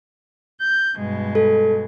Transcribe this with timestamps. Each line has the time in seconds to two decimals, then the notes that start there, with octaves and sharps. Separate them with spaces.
0.60 G6
0.96 G2 B2 G#3
1.35 A4